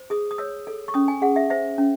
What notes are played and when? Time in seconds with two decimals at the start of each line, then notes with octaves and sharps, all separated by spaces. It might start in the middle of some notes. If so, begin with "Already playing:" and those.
Already playing: C5
0.10 G#4 D#6
0.31 D#6
0.38 C#5 E6
0.67 A4
0.88 C#6
0.94 C#4 D#6
1.08 G#5
1.22 G#4 F#5
1.36 E5
1.50 C5 E5
1.78 C#4